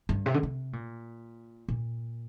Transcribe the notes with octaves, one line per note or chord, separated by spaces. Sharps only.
G2
C3
D3
C3
A#2
A#2